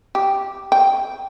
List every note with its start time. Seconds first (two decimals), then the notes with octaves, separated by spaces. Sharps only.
0.15 G4
0.72 G5